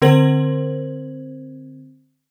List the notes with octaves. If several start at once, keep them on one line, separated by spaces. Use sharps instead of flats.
D3 C4 A#4 C5 G#6 F#7